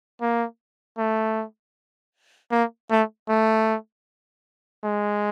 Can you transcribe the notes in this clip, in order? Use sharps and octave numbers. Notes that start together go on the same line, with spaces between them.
A#3
A3
A#3
A3
A3
G#3